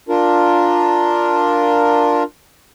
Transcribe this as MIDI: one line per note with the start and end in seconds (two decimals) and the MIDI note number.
0.09 2.23 62
0.09 2.23 65
0.09 2.23 70